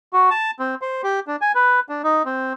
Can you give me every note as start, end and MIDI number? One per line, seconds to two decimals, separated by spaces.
0.13 0.30 66
0.30 0.51 81
0.59 0.75 60
0.82 1.02 72
1.03 1.20 67
1.27 1.36 62
1.41 1.52 80
1.55 1.80 71
1.89 2.02 62
2.04 2.23 63
2.25 2.53 60